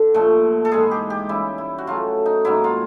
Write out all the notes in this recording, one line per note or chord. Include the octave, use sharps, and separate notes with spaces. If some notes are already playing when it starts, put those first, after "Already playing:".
Already playing: D3
A#2 F3 A3
A4
G#2 E3 G#3 G#4
G4
G4
C#3 E3 G3 E4
E4
F#4
C#3 F#3 A3 F4
D#4
G#2 D#3 F#3 A#3 E4
F4